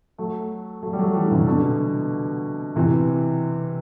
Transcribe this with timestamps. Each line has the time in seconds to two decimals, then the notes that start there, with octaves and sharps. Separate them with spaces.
0.18 F#3 A3
0.83 F#3 A3
0.93 G3
0.99 F#3 A3
1.14 E3 G3
1.26 D3
1.31 C3 E3
1.47 B2 D3
2.76 C3 E3